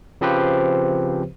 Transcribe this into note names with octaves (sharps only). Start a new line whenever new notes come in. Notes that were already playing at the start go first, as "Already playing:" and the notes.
C#3 F3 C4 G4 B4 C5